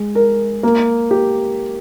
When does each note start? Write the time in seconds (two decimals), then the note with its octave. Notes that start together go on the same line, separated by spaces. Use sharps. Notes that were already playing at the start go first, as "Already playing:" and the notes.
Already playing: G#3
0.15 A#4
0.63 A#3
1.11 G4